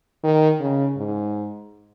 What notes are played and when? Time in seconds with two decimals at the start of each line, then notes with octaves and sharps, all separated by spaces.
0.24 D#3
0.60 C#3
0.97 G#2